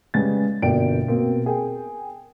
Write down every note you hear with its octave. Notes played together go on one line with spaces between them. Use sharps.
C#3 G3 G#3 B4 A6
G1 B2 A#3 D5 G5 D7
B2 A#3 C4
G#4 A#4 G5